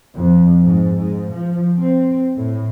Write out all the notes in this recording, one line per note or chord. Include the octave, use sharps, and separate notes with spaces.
F2
G#2
G#2
F3
C4
A2